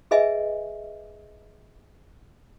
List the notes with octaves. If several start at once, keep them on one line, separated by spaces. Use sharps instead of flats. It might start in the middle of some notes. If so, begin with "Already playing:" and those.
G#4 B4 D#5 E5 G#5